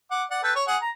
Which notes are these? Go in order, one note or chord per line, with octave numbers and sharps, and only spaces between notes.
F#5 D6
D5 F#5
A4 B4 G5
C#5
G#4 F#5
A#5